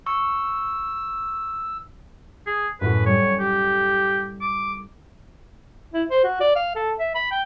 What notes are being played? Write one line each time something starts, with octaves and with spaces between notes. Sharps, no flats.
C#6 E6
G#4
F#2 A2 F#4 B4
G3 C#5
G4
D6
E4
C5
F#4
D5
F5
A4
E5
B5
G5